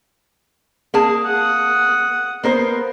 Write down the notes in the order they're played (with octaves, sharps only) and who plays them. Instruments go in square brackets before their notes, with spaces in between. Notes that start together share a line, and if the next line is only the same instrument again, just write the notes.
[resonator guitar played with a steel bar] A#3 G#4 A5
[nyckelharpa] F#5 D#6
[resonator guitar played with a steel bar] A#3 A#4 C5 [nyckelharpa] B3